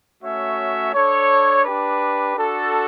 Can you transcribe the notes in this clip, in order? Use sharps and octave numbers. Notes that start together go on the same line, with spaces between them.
A3 C#4 F#4 C#5 E5
D4 A4 C#5
D4 G4 B4
D4 F#4 A4